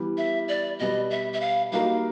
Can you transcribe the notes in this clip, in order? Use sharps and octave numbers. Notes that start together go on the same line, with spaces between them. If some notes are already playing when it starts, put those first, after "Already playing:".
Already playing: E3 G3 B3
E5
D5
B2 G3 B3 D#5
E5
E5
F5
G3 A#3 D#4 F#4 A#4 F5